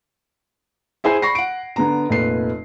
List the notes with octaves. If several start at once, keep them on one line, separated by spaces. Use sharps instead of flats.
E4 G#4 C5 G#5 C7
B5 C#6 A#6 C7
F#5 D7
D3 B3 A#5
F1 A#2 B4 C7